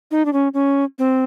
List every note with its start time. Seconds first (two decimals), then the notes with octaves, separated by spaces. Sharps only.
0.11 D#4
0.25 D4
0.33 C#4
0.54 C#4
0.99 C4